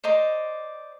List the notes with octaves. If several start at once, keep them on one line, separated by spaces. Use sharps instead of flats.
C5 D5 D#5 A#5